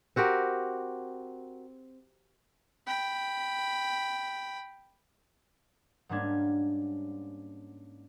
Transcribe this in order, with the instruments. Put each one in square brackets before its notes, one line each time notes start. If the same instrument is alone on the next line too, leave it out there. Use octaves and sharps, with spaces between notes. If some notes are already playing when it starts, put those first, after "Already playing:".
[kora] C4 F#4 G4 A#4
[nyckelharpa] G5 B5
[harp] G#2 G3 A#3 C#4 D4 G#6